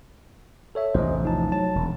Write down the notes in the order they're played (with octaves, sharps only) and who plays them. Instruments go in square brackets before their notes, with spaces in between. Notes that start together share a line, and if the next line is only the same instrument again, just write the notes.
[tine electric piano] A4 C#5 E5
[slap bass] A1 E2 C3 [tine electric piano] C5 D#5
[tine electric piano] F3 D#4 A5
[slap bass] F#3 [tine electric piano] A5
[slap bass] E1